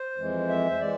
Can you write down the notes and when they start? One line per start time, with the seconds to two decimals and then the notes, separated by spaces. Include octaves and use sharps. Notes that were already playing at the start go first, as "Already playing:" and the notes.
Already playing: C5
0.16 F2 E3 G#3
0.48 E5
0.70 C5
0.80 E3 G#3 D5